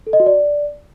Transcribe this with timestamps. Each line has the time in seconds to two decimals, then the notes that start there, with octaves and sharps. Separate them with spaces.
0.07 A4
0.13 D#5
0.20 F#4
0.26 D5